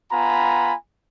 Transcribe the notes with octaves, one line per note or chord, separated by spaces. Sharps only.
B3 F4 G#5 A#5 B5